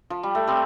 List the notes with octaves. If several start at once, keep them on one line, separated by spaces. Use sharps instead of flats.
F3
G3
A3
G3 C4